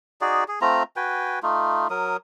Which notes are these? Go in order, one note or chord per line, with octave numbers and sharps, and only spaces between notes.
D#4 F#4 G#4 D5
G#4
A3 C4 F4 A#5
F#4 B4 G5 G#5
A3 D#4 F4
F#3 A#4 D#6